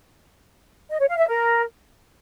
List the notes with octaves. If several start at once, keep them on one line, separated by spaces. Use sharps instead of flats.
D#5
C#5
F5
E5
A#4